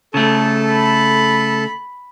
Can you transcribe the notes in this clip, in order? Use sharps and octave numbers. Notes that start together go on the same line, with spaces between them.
C#3 A3 A4 A5
B5